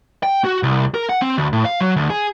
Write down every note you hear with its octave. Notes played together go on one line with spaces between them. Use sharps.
G5
F#4
C2
A#4
F#5
C4
D2
A2
F5
F#3
D2
G#4